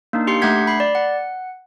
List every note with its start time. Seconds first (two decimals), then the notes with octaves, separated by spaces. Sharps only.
0.13 A#3 D4 D#4
0.27 G4 C6 C7 C#7
0.42 A3 D4 F#5 G6 G#6 B6
0.67 B5 C7
0.80 D5
0.95 F#5